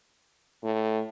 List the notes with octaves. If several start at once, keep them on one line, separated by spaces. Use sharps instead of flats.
A2